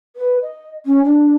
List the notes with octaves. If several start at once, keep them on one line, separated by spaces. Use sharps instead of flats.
B4
D#5
C#4
D4